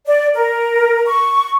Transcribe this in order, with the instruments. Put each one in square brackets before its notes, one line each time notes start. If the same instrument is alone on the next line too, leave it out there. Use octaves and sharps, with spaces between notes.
[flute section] D5
A#4
C#6